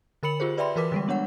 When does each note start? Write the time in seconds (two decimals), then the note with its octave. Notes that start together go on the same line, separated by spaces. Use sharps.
0.23 D3 A#4 B5 C#7 F#7
0.40 F4 G4 G#4 C5
0.58 B4 D5 E5 G5 B5 C6
0.76 E3 F#4 A#4 B4 D6 B6
0.92 D3 G3 G#3
1.08 B3 D4 C#5 F#5